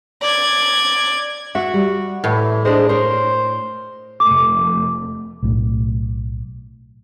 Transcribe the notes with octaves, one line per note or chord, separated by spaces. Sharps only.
D5 G#6
F#4 E5
G3
A2 E3
G#3 D4 G#4 C5
A#4 C5 C#5
F1 A3 D6
B1 A2